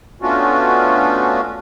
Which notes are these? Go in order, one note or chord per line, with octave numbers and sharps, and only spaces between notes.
A3 B3 C#4 D4 F4 F#4